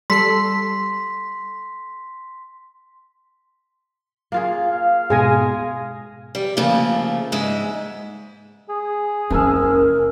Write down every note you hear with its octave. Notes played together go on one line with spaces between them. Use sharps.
G3 A4 C6 B6 C7
A#3 F4 G#4
F5
G#2 B2 G#3 G#4 G#5 A#6
G3
C#3 F3 A3 A#3
G#2 G#3 E5
G#4
F#1 C#4 A#4 G#5 E6